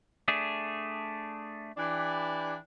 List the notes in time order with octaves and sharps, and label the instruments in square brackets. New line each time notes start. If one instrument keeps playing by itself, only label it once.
[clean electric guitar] A3 D4 G#4
[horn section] E3 D4 G4